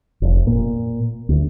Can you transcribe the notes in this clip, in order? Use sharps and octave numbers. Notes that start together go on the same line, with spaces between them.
F1
A#2
D2